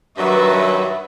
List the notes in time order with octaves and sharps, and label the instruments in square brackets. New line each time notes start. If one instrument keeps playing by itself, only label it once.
[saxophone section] G2 D#3 F#3 [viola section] B4 E5